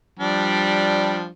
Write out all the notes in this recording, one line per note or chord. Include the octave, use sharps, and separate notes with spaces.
F3 G3 D4